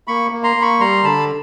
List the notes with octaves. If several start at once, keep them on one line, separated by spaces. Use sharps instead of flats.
A#3 B5 C#6
A#3
A#5 C6
A#3
B5 C#6
G3 A#5 C6
D3 A5 B5